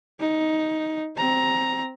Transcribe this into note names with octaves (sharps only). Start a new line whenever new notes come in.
D#4
C4 A#5